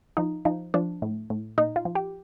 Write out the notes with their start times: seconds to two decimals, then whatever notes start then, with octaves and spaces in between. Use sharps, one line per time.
0.17 F3 D#4
0.45 F3 D#4
0.74 F3 D4
1.02 A2
1.30 A2
1.58 A#2 D#4
1.76 F4
1.85 F3
1.95 G4